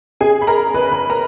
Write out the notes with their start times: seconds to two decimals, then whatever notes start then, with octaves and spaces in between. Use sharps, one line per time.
0.21 G#4 G#5
0.41 B5
0.47 A#4 A#5
0.74 B4 B5
0.92 B4 B5
1.10 A#4 A#5